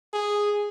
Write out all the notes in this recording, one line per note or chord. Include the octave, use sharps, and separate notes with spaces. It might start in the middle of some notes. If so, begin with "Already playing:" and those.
G#4